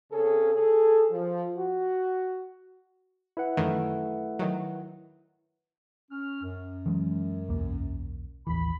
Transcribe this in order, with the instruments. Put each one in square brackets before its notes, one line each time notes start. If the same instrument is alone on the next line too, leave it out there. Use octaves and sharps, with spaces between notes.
[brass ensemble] C#3 C4 C#4 G#4 A4
G#4 A4
F3
F#4
[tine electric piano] E4 B4 F#5
[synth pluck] F#2 D#3 E3 [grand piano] A3
[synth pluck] D#3 F#3
[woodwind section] C#4 F6
F#2
[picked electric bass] E3 F#3 G#3
B1 E2 A#3
[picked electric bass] A1 D#2 E3 [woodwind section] B5